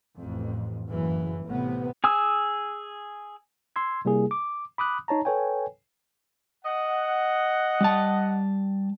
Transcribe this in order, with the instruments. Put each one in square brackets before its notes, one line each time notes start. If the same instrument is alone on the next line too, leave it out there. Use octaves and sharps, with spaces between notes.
[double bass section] A1 F2
F#1 E3
A1 A2 C3 B3
[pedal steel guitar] G#4 G#5 D#6 E6
[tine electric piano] C6 E6 G#6
C3 G3 A#3 E4 G#4
D6
B5 D6 D#6 F#6
D#4 C#5 A5 A#5
A4 B4 C#5 G5 G#5
[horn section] D#5 F#5
[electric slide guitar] G3 A5